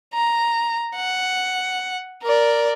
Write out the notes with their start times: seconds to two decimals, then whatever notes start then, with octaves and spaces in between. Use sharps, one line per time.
0.14 A#5
0.96 F#5
2.23 A#4 D5